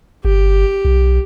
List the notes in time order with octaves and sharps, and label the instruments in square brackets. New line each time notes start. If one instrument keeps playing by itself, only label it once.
[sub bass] G1 [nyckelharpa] G4
[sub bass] B1